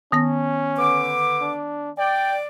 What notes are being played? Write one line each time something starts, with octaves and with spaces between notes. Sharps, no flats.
D#3 B3 C#4 A#6
D3 B4 D6
D4
D5 G5